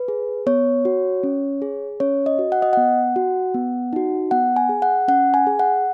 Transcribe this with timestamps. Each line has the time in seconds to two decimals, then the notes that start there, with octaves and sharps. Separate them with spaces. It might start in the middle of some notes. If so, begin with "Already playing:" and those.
Already playing: B4
0.08 G#4
0.46 B3 C#5
0.85 F#4
1.23 C#4
1.62 G#4
2.00 C#4 C#5
2.26 D#5
2.39 F#4
2.52 F#5
2.62 D#5
2.73 B3 F#5
3.16 F#4
3.54 B3
3.93 D#4 F#4
4.31 B3 F#5
4.56 G#5
4.69 G#4
4.82 F#5
5.08 C#4 F#5
5.34 G#5
5.47 G#4
5.59 F#5